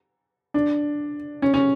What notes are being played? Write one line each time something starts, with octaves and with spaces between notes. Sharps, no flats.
D4
C#4
C#4